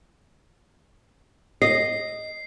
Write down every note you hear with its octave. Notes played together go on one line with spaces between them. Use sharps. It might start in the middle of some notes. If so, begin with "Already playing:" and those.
D#5 C7